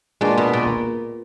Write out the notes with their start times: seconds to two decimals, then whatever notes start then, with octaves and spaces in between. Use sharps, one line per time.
0.21 A#2 G#3 D4 F#4 B4
0.38 B2
0.53 A#2